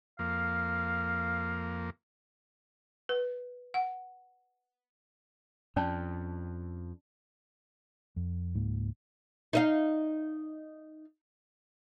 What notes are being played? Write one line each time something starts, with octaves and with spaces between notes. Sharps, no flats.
F2 A#3 F5
B4
F#5
F2 C#4 D5 A5
F2
C#2 G#2 A#3
D#4 D#5 F5